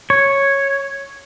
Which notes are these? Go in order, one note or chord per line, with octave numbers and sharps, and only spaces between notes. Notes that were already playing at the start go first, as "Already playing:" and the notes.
C#5